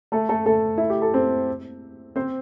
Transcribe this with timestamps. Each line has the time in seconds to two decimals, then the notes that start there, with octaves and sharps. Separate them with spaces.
0.12 A3 A4
0.29 A3 A4
0.46 A3 A4
0.78 E4
0.90 G4
1.02 A4
1.14 C4 C5
2.16 C4 C5